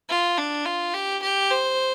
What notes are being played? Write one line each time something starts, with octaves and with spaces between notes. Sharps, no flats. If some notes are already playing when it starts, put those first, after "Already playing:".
F4
D4
F4
G4
G4
C5